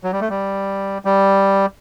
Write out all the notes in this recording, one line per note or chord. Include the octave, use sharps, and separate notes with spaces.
F#3
G3
A3
G3
G3